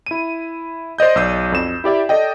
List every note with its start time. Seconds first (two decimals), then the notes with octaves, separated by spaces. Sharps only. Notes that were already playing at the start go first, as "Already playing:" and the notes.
0.06 E4 D#7
0.98 C5 D5 D#5 G6
1.15 B1 D5 E6 G6 C7 D#7
1.52 F2 E7
1.84 E4 G4 D5 E5
2.09 A4 D5 D#5 G5